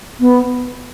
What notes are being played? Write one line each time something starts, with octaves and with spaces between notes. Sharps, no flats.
B3